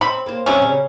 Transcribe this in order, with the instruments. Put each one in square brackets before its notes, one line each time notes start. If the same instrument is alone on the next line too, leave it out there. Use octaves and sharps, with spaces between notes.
[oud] C4 [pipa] B5
[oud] A#3 C5
[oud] F2 F#3 D4 [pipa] C3 C#4
[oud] C#3